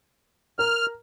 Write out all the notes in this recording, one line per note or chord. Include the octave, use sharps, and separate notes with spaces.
A#4 F6